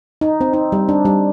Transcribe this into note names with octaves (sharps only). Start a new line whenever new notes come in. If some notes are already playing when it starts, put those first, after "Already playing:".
D#4
C4
D#4
G3
D4
G3